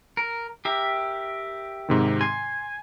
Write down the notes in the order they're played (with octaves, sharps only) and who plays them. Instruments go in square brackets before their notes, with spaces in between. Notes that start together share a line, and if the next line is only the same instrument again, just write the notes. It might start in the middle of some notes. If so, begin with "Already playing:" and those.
[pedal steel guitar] A#4
G4 A#4 E5
[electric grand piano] G#2 C3 D#3
[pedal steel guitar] G#5 [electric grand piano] C6 C7